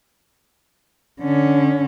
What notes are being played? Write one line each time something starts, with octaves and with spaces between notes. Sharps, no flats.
D3 C#4